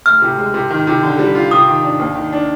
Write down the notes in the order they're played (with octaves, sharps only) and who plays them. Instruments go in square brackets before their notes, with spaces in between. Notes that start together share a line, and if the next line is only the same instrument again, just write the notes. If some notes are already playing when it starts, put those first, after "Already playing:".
[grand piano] D2 [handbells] F6
[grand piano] C3
G#3
C3
D#3
C3
D3
G3
F4
[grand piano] C3 [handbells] D#6
[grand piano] D#3
D4
D#2
D#3
D4